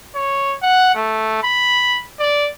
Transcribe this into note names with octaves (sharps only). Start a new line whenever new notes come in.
C#5
F#5
A3
B5
D5